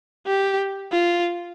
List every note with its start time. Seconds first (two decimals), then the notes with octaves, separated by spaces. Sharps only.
0.27 G4
0.92 F4